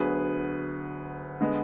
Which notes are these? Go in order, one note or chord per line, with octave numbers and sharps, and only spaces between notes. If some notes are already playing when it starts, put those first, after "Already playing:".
Already playing: D2 D3 F#3 B3 G#4 B4
D3 G#3 B3